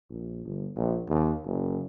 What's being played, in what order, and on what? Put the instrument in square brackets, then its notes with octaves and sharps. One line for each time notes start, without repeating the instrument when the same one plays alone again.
[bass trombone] A#1
G1
A#1
D#2
F#1